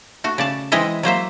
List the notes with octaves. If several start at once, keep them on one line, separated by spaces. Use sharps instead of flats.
A3 F#4
C#3 D5 A5
E3 G#3 C4 E4 D#5 E5
F#3 A#3 C5 E5